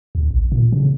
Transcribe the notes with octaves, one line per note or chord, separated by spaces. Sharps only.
D2
A1
A#2
C#3